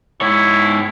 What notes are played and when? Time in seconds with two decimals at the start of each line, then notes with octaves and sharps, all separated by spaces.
0.21 G#2 E4 C#5